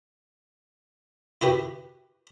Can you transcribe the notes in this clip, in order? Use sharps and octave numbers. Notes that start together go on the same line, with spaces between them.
E4 F#4 G4 B4